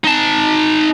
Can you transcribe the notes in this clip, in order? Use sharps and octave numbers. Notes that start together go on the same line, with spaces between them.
D#4 A5